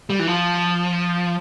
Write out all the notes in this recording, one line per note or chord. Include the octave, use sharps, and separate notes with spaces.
G3
E3
F3